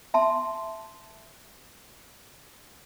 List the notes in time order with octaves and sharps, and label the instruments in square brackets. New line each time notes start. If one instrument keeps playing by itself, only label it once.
[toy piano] E5 A5 C6